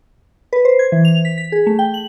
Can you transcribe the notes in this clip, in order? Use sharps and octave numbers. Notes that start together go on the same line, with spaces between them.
B4
C5
G#6
E3
F7
B6
B6
G#4
A3
G5
F#7